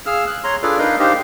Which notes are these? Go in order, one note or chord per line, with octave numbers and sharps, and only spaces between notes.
G#4 F5 E6 F6
F#6
C#5 A#5 C6
D4 F4 G#4 A4 B4 D5
D4 D#4 A#4 B4 D#5 F5
D4 D#4 G4 C5 D#5 F5